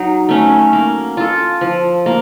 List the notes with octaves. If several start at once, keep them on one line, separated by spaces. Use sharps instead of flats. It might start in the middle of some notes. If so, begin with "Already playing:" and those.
Already playing: F#3 D#4
A3 C#4
A#3
F4 A4
F3
A#3